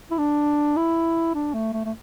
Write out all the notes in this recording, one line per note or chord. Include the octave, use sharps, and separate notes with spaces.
E4
D4
E4
D4
A3
A3
A3